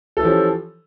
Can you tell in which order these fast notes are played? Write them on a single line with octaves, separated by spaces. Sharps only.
A4 E3 G4 F3 C#4